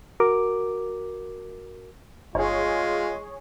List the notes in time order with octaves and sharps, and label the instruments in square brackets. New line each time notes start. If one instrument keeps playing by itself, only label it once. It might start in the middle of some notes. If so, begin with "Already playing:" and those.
[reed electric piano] F#4 A#4 D6
[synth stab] G1 [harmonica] G#3 [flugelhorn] F4 [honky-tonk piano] G#4 C#5